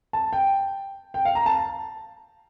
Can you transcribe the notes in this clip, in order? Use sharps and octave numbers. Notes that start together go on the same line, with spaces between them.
A5
G5
G5
F5
A#5
A5